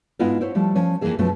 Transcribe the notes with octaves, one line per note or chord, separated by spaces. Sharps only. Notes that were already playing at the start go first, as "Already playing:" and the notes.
G#2 B3 E4 F4 D#5 F5
E4 C5 C#5
F3 G3 A3
F3 C#4 C#5
F2 D#3 E3 A#3 G#4 E5
F#2 B2 F3 A3 B3 C#4